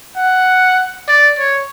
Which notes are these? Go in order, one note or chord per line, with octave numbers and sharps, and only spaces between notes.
F#5
D5
C#5